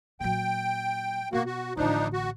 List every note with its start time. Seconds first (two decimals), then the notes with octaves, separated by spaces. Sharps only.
0.20 A#2 F#3 G5
1.33 B2 A#3 F#4
1.46 F#4
1.77 A1 D3 F3 D4 D#4
2.13 F#4